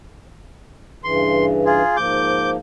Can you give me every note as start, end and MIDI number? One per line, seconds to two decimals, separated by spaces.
1.04 1.82 43
1.04 1.82 49
1.04 1.82 52
1.04 1.45 84
1.66 1.96 65
1.66 1.96 68
1.97 2.57 44
1.97 2.57 53
1.97 2.57 58
1.97 2.50 86
1.97 2.50 91